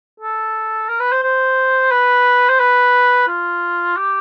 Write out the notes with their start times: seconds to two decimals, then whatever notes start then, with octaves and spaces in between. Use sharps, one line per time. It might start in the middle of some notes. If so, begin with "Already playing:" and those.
0.20 A4
0.89 A#4
1.00 B4
1.12 C5
1.23 C5
1.91 B4
2.49 C5
2.60 B4
3.28 F4
3.97 G4